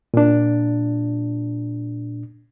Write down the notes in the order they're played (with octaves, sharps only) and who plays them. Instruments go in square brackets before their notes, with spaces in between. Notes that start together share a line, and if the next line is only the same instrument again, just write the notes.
[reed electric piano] A#2 D4